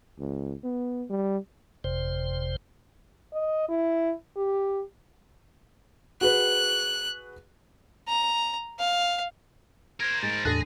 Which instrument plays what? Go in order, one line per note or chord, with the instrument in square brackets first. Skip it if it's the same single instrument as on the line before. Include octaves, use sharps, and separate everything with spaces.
[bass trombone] C#2
B3
G3
[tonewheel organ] G1 F2 C3 C5
[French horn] D#5
E4
G4
[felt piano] F#4 G#4 B4 [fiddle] F#6
[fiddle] A#5
F5
[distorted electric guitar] A#4 C5 [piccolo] G#6
[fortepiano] G#2 [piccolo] A6
[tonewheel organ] E2 A2 A#6 [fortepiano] D3 A4 F#6 [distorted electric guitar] G#4